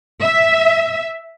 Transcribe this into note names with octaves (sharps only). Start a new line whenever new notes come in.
E5